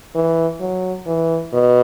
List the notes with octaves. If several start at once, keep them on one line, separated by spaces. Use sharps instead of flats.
E3
F#3
E3
B2